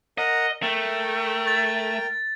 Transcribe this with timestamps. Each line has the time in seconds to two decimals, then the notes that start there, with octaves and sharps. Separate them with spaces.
0.18 A#4 D#5 F#5
0.63 A3 A#4 G5
1.47 A6